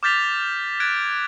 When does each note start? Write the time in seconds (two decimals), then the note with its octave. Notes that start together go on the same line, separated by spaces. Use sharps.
0.03 D6 F6 G6 A6 B6 F7
0.80 F#6 G#6 A6 D7